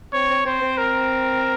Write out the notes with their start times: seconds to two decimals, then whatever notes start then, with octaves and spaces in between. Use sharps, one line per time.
0.13 C4 C#5
0.30 C4
0.45 C4 C5
0.62 C4
0.78 A#4